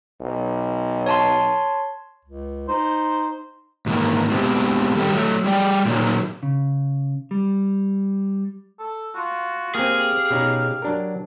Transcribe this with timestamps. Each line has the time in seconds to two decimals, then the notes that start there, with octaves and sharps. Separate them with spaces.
0.21 B1
1.06 C#5 A5 C6
2.25 C#2
2.68 D#4 C5
3.86 G#2 D#3 E3 A#3
4.31 G#3 B3 C4 G4
4.96 D#3 G3 G4 A4
5.12 F#3 A3
5.44 G3 G#4 D5 G5
5.85 A#2 D#3 F#3
6.43 C#3
7.31 G3
8.79 A4
9.15 F4 F#4
9.75 A#3 C4 G4 G#4 F5
10.31 B2 C#4 D#4
10.82 F#3 D4 A#4